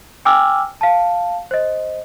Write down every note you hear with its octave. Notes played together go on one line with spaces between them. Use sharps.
G5 G#5 D6 E6 F6
F5 A5
C5 D#5